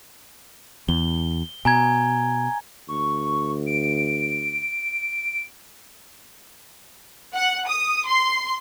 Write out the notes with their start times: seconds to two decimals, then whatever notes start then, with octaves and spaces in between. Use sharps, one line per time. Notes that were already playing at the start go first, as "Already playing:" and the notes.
0.89 E2 G7
1.65 B2 G#5 A#5 G#6
2.88 D2 C#6
3.66 D7
7.35 F#5
7.67 D#6
8.07 C6